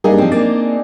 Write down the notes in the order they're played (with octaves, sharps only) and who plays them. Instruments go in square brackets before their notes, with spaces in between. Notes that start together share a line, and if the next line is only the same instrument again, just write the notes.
[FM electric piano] G2 A#3 G4 [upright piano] D4 D#4 G#4
[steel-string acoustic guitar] F3 C4
[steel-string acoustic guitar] A#3 C4 [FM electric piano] D5